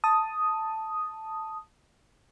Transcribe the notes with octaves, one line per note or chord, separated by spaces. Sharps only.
A5 D#6